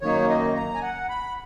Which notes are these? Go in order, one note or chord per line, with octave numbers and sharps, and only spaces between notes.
F#2 D#3 A#3 D#4 C#5
D#5
A#5
G#5
F#5
B5